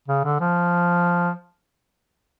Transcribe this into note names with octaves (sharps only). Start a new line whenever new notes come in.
C#3
D3
F3